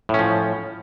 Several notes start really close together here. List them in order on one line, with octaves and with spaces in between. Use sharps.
A2 C#4 F3